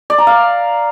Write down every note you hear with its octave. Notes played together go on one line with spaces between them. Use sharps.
D5
A#5
F5